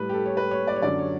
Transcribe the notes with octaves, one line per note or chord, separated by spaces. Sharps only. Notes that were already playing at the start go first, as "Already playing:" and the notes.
Already playing: A2 G3 B4
G4
A4
C#5
B4
C#5
D5
C#5
F#2 D3 F#3 D5
C#5